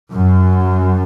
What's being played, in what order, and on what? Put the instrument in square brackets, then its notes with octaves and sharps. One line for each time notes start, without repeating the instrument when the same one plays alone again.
[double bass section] F#2